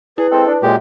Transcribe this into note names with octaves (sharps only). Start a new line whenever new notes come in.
E4 G#4 B4
G#3 C4 A4
D4
F#2 A#2 G#3 G4